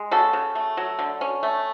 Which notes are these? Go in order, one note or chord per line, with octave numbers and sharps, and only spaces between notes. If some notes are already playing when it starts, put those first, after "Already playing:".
Already playing: G#3
C#3 F#4 A4
C#3
A3
F#3
D3
C#4
A3